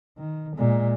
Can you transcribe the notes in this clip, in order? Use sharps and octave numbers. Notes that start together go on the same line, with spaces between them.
D#3
A#2 G#3